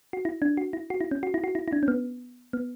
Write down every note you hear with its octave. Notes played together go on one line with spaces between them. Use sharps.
F#4
E4
D4
F#4
E4
F#4
E4
C#4
F#4
E4
F#4
E4
E4
D4
C#4
B3
B3